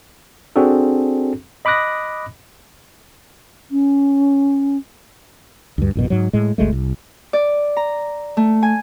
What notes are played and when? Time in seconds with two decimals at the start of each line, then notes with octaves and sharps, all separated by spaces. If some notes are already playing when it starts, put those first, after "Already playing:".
0.56 C4 D4 F#4 G#4 A4
1.65 D#5 B5 D6 D#6 F#6 A#6
3.71 C#4
5.78 D2 G2
5.95 A1 F#2 B2
6.10 G#2 F#3
6.33 A2 G#3
6.58 G1 D2 G#3 A3
6.73 C2
7.33 D5
7.77 A#5
8.37 A3
8.63 G#5